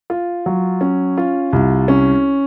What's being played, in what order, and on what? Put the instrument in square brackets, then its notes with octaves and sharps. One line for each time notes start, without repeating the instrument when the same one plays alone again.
[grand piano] F4
F#3
C#4
F4
C2
C#4